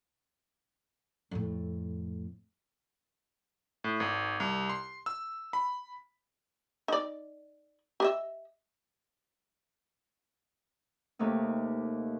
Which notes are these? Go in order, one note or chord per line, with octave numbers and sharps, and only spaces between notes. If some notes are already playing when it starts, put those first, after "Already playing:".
F2 A2
A2
G#1
C2
C6
E6
B5
D#4 D5
G4 D#5 E5
D#2 C3 A3 D#4